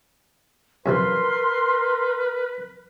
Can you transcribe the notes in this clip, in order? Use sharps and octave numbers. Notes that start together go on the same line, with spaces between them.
F#2 C3 F3 A#4 B4 C6